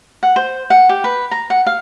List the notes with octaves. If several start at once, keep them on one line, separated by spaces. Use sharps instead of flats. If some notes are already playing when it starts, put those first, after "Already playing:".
F#5
C5
F#5
G4
B4
A#5
F#5
F5